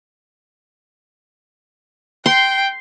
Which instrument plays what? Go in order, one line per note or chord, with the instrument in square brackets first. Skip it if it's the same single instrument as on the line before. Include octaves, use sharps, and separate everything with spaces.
[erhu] G5 [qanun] C6